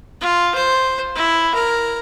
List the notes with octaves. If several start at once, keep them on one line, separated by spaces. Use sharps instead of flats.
F4
C5
E4
A#4